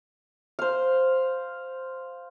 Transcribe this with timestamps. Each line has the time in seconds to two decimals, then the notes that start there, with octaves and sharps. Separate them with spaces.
0.59 C5 F5